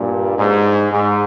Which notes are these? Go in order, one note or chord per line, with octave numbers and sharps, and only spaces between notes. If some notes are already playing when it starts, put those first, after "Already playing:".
Already playing: G2 A#2
G#2
G#2